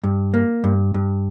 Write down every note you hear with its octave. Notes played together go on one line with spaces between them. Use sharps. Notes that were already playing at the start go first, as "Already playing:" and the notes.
G2
A#3
G2
G2